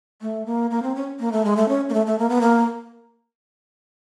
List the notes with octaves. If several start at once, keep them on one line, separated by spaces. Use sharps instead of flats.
A3
A#3
A#3
C4
C#4
A#3
A3
G#3
A3
C#4
A#3
A3
A3
A#3
B3
A#3